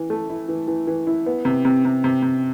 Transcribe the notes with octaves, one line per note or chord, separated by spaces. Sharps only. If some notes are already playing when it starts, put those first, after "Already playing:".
Already playing: E3
A3
E4
E3
E3
E3
E4
B3
C3
C3
C3
C3
C3